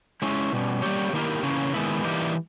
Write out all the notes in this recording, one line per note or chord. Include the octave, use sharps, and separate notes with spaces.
G#3 C#4 E4
B2 G3 C#4
G3 A#3 C#4 G4 C#5
D#3 A#3 E4 G4 A#4
C#3 E3 A#3 C#4
D#3 G#3 B3 E4
E3 G3 A#3 D#4 G4